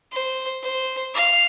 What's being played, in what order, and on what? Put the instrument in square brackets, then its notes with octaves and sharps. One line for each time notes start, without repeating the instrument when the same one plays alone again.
[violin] C5
C5
F5